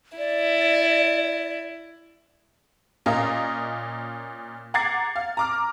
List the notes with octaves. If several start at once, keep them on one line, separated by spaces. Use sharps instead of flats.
E4 D5
A#2 C#4 A#4 D#5 F5
F#5 A#5 D6 G#6 A6 C7
F5
A#5 D6 F6